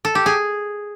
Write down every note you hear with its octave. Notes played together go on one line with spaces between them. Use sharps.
A4
G4
G#4